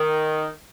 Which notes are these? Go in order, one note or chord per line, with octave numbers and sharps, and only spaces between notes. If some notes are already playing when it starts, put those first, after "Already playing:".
Already playing: D#3